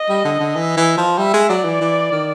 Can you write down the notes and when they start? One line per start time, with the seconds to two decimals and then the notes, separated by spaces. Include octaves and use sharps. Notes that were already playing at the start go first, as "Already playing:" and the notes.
Already playing: D#5
0.09 G3
0.25 D3
0.40 D3
0.56 E3
0.77 E3
0.98 F3
1.18 G3 E5
1.34 G#3
1.50 F#3 D5
1.65 E3
1.81 E3
2.12 D#3